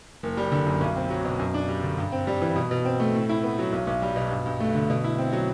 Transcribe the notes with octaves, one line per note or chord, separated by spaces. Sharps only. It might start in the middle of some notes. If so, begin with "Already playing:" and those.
F#1
G3
D3
F#2
B1
C4
F#3
B2
F#2
D4
G3
D3
G2
C4
G3
E3
B2
B2
C4
A3
A2
E4
B3
F#3
B1
B1
G3
B2
G2
G2
A3
D3
B2
E4
C4
F#3